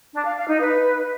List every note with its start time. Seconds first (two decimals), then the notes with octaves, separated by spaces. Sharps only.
0.13 D4
0.25 F5
0.37 F5
0.48 D#4
0.60 B4